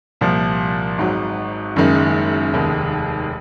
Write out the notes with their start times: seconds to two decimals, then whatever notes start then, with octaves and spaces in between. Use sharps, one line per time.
0.21 C2 A#2 F3
0.98 G#1 G#2 F#3
1.76 F#1 F#2 D#3 G#3
2.53 F1 D#2 D#3 G#3